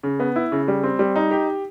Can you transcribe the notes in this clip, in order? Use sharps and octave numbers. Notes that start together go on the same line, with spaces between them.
C#3
B3
E4
C#3
G3
C4
G3
D#4
G4